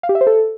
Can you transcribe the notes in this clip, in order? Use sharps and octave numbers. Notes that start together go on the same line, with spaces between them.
F5
G4
E5
C5
A4